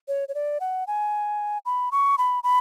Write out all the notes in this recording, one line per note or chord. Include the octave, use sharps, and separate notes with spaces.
C#5
C#5
D5
F#5
G#5
B5
C#6
B5
B5